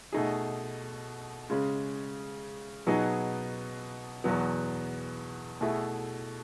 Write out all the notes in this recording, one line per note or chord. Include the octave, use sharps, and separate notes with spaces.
B2 A3 D#4 G#4
C#3 G#3 C#4
B2 F#3 B3 D#4 G#4
E2 B2 F#3 B3
B2 A3 E4 G#4